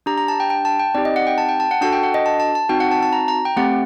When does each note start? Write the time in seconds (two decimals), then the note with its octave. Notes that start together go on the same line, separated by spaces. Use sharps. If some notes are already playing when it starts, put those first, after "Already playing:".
0.06 D4 G4 A#5
0.18 A#5
0.28 A5
0.40 G5
0.50 G5
0.65 A5
0.80 G5
0.94 C4 D#4 G4 D5
1.05 D#5
1.16 F#5
1.27 G5
1.38 A5
1.49 G5
1.60 A5
1.71 F#5
1.81 D4 F#4 A4 A5
1.93 G5
2.03 F#5
2.14 D#5
2.26 A5
2.40 A5
2.55 A5
2.69 C4 D#4 F#4 G5
2.80 F#5
2.91 A5
3.03 A5
3.13 A#5
3.28 A#5
3.45 G5
3.56 A3 C4 G4 F#5